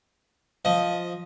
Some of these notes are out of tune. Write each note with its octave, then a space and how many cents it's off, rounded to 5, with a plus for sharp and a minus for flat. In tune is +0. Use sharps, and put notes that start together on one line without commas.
F3 +0 D#5 +0